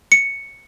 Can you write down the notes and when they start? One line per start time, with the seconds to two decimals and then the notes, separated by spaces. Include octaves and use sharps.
0.12 C#7